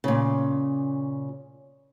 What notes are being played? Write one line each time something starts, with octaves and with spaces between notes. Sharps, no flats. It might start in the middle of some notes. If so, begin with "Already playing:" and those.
A#2 C#3